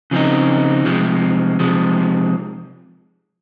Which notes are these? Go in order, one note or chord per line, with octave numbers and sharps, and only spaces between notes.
C#3 F3 C4 D#4
C3 F3 G#3
C3 F3 G#3